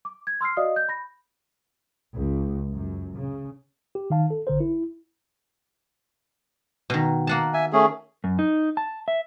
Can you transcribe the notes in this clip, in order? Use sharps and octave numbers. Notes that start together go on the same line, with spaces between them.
D6
G#6
C6 E6 F6 C7
F#4 D5 D#5 F5 D#6
G6
B5 A#6
C#2
F#2
C#3
G4
D#3 D#4 F5 A5
A4
A1 D3 A#4 C5
E4
B2 D#3
A#3 F#5 A5
E5 G#5
A3 C#4 G#4
F#2
D#4
A5
E5